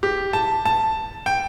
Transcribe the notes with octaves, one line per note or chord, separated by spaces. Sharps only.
G4
A5
A5
G5